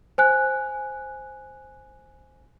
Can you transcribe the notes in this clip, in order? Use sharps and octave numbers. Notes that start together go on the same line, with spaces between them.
C5 G#5 F#6